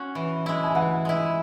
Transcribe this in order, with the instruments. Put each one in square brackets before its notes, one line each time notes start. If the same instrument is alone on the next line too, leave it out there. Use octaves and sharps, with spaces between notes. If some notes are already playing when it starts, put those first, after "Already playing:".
Already playing: [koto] C#4 F#4
E3
G#3 E4
[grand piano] G#5
[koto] E3 [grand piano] F#5
[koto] G#3 E4